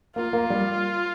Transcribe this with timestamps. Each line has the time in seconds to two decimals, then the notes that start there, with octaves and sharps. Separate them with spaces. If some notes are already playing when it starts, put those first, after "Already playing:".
0.16 A#3 F4
0.33 A#3
0.50 G3